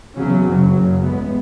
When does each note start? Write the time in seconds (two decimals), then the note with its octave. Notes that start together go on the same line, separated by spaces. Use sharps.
0.15 E2 C#3 F#3 C#4
0.44 F#1 F#2 C#3 F#3
0.73 F#1 F#2 C#3
1.02 A1 A2 G#3 B3